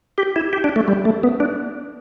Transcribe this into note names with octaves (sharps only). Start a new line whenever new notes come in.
G4
E4
G4
D4
A3
G3
A3
B3
D4